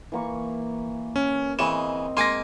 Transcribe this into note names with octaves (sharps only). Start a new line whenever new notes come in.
E3 A#3 C#6
C#4
C#3 E3 C4 D#5 E7
G#3 A#3 G#5 C6 D6 A#6